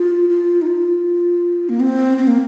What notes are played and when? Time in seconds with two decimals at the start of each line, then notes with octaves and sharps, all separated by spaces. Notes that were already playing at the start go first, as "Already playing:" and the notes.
Already playing: F4
0.29 F4
0.62 D#4
0.67 F4
1.69 A#3
1.80 C4
2.18 C4
2.27 A#3